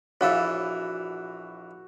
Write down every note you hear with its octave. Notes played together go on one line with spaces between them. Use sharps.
A#1 E3 F#4 A4 C#5 F5